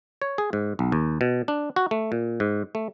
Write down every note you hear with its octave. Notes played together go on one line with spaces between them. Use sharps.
C#5
G#4
G#2
B1
D#2
B2
D4
F#4
A3
A#2
G#2
A3